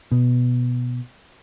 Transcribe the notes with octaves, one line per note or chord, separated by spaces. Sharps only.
B2